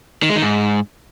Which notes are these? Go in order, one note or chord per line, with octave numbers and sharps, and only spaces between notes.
D#3
G#3
D#3
G#2